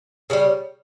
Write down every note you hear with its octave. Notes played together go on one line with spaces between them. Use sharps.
C#3 E3 G3